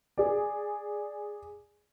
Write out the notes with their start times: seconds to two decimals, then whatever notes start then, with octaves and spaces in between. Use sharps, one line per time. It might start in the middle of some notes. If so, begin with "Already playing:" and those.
0.18 G#4 D5